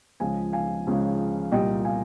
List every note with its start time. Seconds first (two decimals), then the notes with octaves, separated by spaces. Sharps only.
0.20 C#2 C#3 F3 G#3 F5 G#5
0.53 F5 G#5
0.87 C#2 C#3 F3 G#3
1.52 C2 A#2 G3 D#5 G5
1.85 F5 G#5